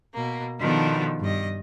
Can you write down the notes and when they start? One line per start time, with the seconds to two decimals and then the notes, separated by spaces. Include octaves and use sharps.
0.14 B2 A#3
0.59 B2 D#3 F3 B3 D4 A4
1.20 G2 D#5